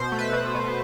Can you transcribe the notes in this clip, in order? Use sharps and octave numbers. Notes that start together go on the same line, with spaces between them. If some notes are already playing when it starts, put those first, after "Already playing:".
Already playing: B2 C5
A3
B4
B2
B2